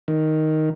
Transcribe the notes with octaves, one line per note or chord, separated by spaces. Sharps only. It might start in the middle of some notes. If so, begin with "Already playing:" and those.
D#3